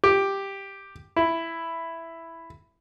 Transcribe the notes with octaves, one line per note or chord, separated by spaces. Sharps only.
G4
E4